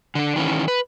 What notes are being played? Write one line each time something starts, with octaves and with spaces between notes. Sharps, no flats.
D3 D4
D#3 E3 C#4
B4